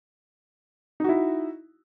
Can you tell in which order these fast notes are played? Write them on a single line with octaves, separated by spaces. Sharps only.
D#4 F#4 E4